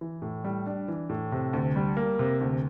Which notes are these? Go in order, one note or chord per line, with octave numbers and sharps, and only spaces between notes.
E3
A2
G3
D4
E3
A2
C3
D2
G3
A#3
C3
D2